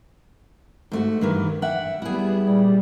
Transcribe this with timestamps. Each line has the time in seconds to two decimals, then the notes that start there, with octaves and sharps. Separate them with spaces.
0.92 G#2 A3 F#4
1.21 G2 D#3 E3
1.62 E5 F#5 G5
2.02 G3 B3 E4 G#4
2.43 A#2 G3